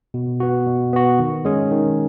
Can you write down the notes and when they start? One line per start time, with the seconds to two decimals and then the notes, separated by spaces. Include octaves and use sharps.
0.14 B2
0.40 B3 F#4
0.66 B2
0.93 B3 F#4
1.19 D#3
1.45 G#3 C#4 G#4
1.71 D#3